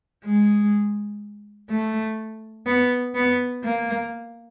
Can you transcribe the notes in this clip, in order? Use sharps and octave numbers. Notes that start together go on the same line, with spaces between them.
G#3
A3
B3
B3
A#3